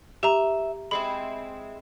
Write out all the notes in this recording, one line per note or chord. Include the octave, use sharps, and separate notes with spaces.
G4 E5 A#5
G#3 C4 E4 B5